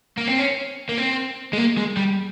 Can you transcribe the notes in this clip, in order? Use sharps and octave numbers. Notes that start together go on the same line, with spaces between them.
A#3
C4
C#4
A#3
C4
G#3
A#3
G#3
G3